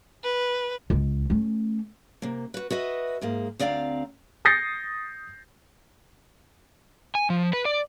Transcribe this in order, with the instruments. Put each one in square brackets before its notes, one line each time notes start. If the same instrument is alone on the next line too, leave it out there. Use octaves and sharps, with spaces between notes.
[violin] B4
[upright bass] C#2
A3 C#4
[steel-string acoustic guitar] C3 A#3
F#4 B4
F#4 B4 D#5 E5
G#2 G#3 A#3
D2 C4 D5 F5 G5 A#5
[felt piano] D#6 G6 A6 A#6 C7 C#7
[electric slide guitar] G#5
F3
B4
D5